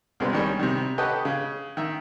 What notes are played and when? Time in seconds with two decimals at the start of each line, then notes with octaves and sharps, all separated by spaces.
0.20 C2 B2 G#3 B3 C4
0.33 D#3 G3 C#4 C#5
0.59 C3 D#3
0.98 G4 A4 B4 C#5 D#5 F#5
1.25 C#3
1.77 D#3 E5